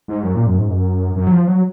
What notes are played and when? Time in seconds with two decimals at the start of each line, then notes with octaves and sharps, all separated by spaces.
0.08 G#2
0.23 F#2
0.35 A#2
0.47 F#2
0.58 G#2
0.69 F#2
1.16 F#2
1.27 F#3
1.31 F3
1.48 F#3